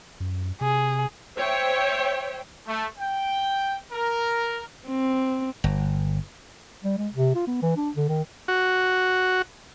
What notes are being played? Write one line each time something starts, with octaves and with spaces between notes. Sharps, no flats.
F#2
C3 G#4
C5 C#5 E5 G5
A3
G5
A#4
C4
G1
G3
G#3
C3
F4
B3
E3
D4
D3
D#3
F#4